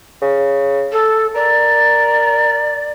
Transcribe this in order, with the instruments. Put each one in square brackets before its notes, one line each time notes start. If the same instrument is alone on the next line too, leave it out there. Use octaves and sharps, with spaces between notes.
[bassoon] C#3
[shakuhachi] A4
[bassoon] A#4 [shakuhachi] D5